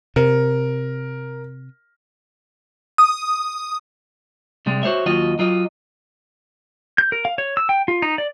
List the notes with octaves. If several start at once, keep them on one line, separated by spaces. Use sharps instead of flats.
C3 A#4
D#6
C3 G3 G#3
F#4 C5 C#5 E5
D#2 F#3 F4 F#4 D#5
F#3 F4 D#5
G6
A#4
F5
C#5
E6
G5
F4
D#4
D5